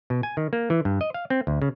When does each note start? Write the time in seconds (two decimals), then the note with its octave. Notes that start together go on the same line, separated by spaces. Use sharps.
0.10 B2
0.23 G#5
0.37 D#3
0.53 A#3
0.70 E3
0.85 G2
1.01 D#5
1.14 F5
1.30 C4
1.47 D2
1.62 C#3